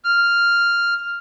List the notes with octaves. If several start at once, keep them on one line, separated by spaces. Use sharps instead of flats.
F6